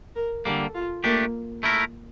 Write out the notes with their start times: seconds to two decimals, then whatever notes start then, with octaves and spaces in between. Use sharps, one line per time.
0.16 A#4
0.45 D3 G3 A#3 A4
0.75 F4
1.03 A3 A#3 D4 G4
1.63 A3 E4 A#4